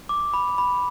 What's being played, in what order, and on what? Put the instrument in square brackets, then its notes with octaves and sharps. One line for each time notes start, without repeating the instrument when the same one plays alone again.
[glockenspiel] D6
B5
B5